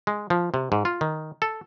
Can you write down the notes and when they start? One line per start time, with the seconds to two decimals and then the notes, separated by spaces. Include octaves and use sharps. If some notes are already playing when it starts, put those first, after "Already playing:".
0.07 G#3
0.30 F3
0.54 C3
0.72 G#2
0.85 F4
1.01 D#3
1.42 A4